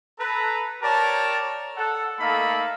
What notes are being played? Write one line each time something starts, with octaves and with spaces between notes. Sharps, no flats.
A4 B4 A#5
G4 A#4 C#5 D5 A5
A4 F#5
A3 A#3 D#4 A4 F5 B5